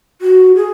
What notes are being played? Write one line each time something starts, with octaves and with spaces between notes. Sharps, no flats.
F#4
G#4